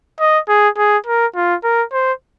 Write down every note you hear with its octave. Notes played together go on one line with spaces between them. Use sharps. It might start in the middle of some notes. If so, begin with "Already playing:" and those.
D#5
G#4
G#4
A#4
F4
A#4
C5